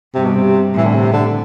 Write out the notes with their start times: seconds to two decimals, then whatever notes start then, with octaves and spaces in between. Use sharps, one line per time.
0.14 G2 C3
0.25 B2
0.34 C3
0.74 A2 E3
0.85 D3
0.94 C3
1.13 D3